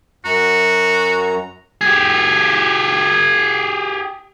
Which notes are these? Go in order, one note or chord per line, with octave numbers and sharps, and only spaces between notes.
F#2 F#4 A#5
G4 G#4